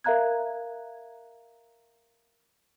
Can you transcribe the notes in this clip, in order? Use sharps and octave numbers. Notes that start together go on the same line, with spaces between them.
A#4 E5 F5 A#5 F#6 G#6